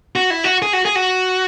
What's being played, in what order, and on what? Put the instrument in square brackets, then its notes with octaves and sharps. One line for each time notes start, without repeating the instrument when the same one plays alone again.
[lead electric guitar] F#4
E4
F#4
G#4
F#4
G#4
F#4